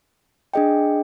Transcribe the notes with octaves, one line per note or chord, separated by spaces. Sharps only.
D4 G#4 D#5 G5